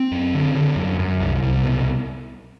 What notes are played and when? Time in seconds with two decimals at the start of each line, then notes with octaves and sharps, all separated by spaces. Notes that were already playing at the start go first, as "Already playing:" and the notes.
Already playing: C4
0.12 F#2
0.34 D3
0.55 D3
0.76 F#2
0.99 F#2
1.20 C2
1.43 C2
1.63 B2